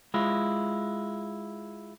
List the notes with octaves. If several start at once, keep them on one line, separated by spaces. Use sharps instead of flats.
G#3 E4 F4